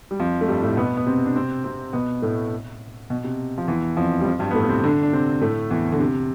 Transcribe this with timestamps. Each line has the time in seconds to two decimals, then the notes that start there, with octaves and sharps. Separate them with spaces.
0.11 G3
0.19 F2 F3
0.41 A3
0.48 G2 G3
0.63 A2 A3
0.77 B2 B3
0.97 B3
1.06 C3 C4
1.26 D4
1.35 C3 C4
1.64 C3 C4
1.93 B2 B3
2.22 A2 A3
3.10 B2
3.24 C3
3.58 F3
3.68 E2 E3
3.97 F2 F3
4.21 G3
4.25 F2 F3
4.40 G2 G3
4.51 B3
4.55 A2 A3
4.63 B3
4.69 C3 C4
4.84 D3 D4
5.03 D4
5.13 C3 C4
5.41 A2 A3
5.70 E2 E3
5.92 D3
6.00 C3